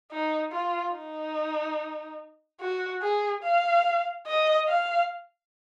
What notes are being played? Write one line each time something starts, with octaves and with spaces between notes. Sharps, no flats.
D#4
F4
D#4
F#4
G#4
F5
D#5
F5